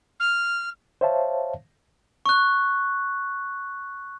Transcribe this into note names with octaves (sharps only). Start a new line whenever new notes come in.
F6
C5 C#5 E5 F5 A5
C#6 F#6